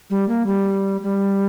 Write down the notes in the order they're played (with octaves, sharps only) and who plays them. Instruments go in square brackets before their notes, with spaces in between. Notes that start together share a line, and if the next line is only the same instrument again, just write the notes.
[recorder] G3
A#3
G3
G3